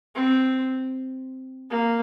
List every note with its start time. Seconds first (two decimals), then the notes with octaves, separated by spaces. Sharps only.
0.15 C4
1.70 A#3